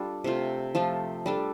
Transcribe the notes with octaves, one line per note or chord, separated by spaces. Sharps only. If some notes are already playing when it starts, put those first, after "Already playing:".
Already playing: G3 D4 F4 A4
C3 A3 F4
F3 A3 F4 A4
G3 D4 A4